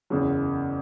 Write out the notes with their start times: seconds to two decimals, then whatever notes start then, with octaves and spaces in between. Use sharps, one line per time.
0.10 F#1 E2 C#3 F#3